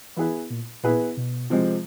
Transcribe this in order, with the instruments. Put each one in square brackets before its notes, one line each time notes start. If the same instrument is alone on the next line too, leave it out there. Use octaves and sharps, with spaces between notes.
[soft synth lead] E3 [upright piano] B3 E4 G#4 B4
[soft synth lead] A#2
[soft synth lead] A#2 [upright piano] B3 E4 G#4 B4
[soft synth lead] B2
[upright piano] C3 F3 G#3 C4